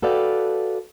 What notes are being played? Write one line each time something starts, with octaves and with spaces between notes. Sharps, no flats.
F#4 A4 B4 D5 F5 G5